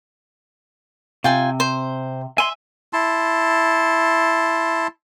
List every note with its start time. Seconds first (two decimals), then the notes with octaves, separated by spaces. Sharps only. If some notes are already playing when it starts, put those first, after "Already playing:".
1.24 C3 F4 G5 G#5
1.60 C5
2.38 E5 G#5 C6
2.93 E4 A5 C6